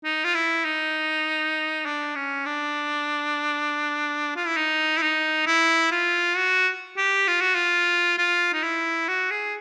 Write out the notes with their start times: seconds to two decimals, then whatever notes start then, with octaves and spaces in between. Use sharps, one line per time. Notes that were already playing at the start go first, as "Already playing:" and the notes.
0.04 D#4
0.24 F4
0.35 E4
0.65 D#4
1.85 D4
2.15 C#4
2.45 D4
4.36 F4
4.46 E4
4.56 D#4
4.97 E4
5.02 D#4
5.46 E4
5.91 F4
6.37 F#4
6.97 G4
7.28 F4
7.41 F#4
7.55 F4
8.18 F4
8.53 D#4
8.63 E4
9.08 F#4
9.31 G#4